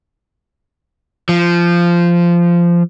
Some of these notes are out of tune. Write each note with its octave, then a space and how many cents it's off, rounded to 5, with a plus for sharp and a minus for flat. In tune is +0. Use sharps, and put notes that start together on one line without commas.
F3 -15